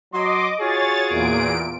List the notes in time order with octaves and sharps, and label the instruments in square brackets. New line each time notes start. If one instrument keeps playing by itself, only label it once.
[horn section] F#3 C6 [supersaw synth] D#5 D6
[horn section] F4 F#4 G#4 [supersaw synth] C#5 A6
[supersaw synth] E2 A#2 D7